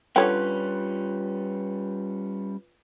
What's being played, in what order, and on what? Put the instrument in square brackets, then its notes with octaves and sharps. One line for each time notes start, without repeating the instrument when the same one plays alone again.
[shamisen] D3 C#5 G5 [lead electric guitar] G3 C#4 [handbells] F4 B4